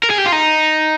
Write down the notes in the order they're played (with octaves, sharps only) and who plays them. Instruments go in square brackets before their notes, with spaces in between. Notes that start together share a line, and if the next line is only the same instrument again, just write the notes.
[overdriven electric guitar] A#4
G#4
G4
F4
D#4